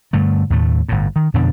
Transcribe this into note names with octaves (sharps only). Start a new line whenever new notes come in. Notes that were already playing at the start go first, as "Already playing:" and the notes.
G2 D3 A3
D#2 A2 A3
G1 A2
D#3
F2 B2 D3 D4